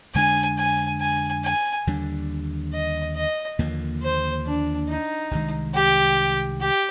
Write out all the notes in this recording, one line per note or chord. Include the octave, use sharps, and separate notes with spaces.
F2 D3 G#3 D4 G#5
G#5
G#5
G#5
D#2 D3 G3 D4
D#5
D#5
D#2 D3 F3 A#3
C5
D4
D#4
C2 C3 D#3 G#3
G4
G4